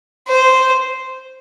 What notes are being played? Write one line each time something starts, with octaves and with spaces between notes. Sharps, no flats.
C5